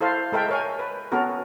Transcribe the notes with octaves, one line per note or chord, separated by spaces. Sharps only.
E4 A4 C5 F5
G#3 A4 A#4 E5 G5
A#4 C#5 G#5
B4
B3 C#4 F#4 A4 A#4